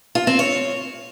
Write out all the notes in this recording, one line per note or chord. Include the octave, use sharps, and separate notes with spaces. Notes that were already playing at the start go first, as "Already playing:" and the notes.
F4
C4
C#5